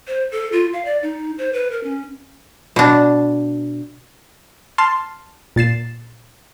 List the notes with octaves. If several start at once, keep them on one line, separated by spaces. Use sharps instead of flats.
C5
A4
F4
F5
D5
D#4
C5
B4
A#4
C#4
B2 D4
A5 C6 F6
A#2 A6 C7 E7